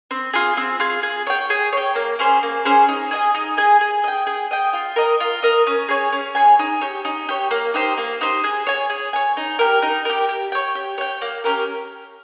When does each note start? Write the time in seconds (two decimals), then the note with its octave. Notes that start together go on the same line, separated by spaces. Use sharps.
0.11 C4
0.33 F4 G#4
0.57 C4
0.80 F4 G#4
1.03 G#4
1.27 C#5 G5
1.50 G#4
1.73 C#5 G5
1.95 A#3
2.19 C#4 G#4 C5
2.43 A#3
2.65 C#4 G#4 C5
2.89 D#4
3.11 G#4 D#5 G#5
3.35 D#4
3.57 G#4 D#5 G#5
3.81 G#4
4.04 D#5 G5
4.27 G#4
4.51 D#5 G5
4.73 F4
4.96 A#4 D#5
5.20 F4
5.43 A#4 D#5
5.67 C#4
5.89 G#4 C#5 G#5
6.12 C#4
6.35 G#4 C#5 G#5
6.59 D#4
6.81 G4 C#5
7.05 D#4
7.29 G4 C#5
7.51 A#3
7.74 D#4 G4 C5
7.98 A#3
8.21 D#4 G4 C5
8.44 G#4
8.67 C#5 G#5
8.90 G#4
9.13 C#5 G#5
9.37 D#4
9.59 G4 A#4
9.82 D#4
10.05 G4 A#4
10.29 G4
10.52 C#5 G5
10.75 G4
10.98 C#5 G5
11.21 A#3
11.44 C#4 G4 A#4